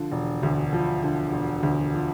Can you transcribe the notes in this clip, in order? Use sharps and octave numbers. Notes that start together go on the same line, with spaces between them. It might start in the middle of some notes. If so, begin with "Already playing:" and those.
Already playing: D3 F3
E1
D2
F3
D3
E1
D2
F3